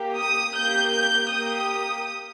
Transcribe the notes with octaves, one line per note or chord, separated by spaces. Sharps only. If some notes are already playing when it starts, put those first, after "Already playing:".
Already playing: A#3 G4
D#6
A#3 G4 G6
G6
A#3 G4 D#6